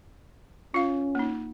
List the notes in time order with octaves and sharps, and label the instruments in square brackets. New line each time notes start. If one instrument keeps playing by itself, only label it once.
[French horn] C#4 [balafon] F4 F5
[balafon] A#3 D#4